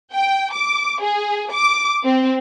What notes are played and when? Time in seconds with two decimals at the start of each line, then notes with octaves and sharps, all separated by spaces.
0.13 G5
0.53 D6
1.01 G#4
1.52 D6
2.04 C4